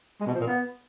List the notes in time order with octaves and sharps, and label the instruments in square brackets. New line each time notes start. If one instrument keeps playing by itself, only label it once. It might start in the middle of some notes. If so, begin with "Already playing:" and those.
[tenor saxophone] G#3
B2
F3
A#2
B3